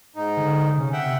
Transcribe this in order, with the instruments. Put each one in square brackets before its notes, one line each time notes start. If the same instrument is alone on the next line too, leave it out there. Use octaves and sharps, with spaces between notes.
[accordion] G#2 D#4
[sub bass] D3
[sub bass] C3 [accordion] C#4
[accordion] E5 F#5 G5